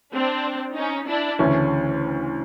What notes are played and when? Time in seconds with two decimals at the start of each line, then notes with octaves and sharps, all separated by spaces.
0.13 C4 D4
0.75 C#4 D#4
1.07 D4 E4
1.39 D2 C#3 E3 A3 C#4